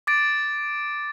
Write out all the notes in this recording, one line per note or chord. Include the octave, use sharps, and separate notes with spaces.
D6 A6 D7